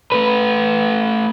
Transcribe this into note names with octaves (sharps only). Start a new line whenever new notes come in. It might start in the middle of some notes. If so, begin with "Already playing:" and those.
A3 B4